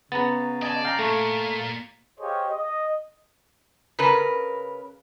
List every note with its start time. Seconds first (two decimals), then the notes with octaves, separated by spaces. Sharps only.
0.12 C#3 B3 B4 A#5 A6
0.62 D5 D#5 G#5 A5
0.85 F5 G5 A#5
0.99 A#2 A3
2.20 G4 G#4 C5 C#5 D#5 F5
2.51 D#5
3.99 C#3 A#4 B4